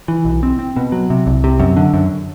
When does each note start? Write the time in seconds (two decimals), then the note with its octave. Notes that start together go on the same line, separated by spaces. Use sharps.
0.08 E3
0.25 B1
0.43 C4
0.59 C4
0.77 B2
0.92 F#3
1.10 C3
1.27 C2
1.44 C3
1.60 F#2
1.77 D3
1.94 F#2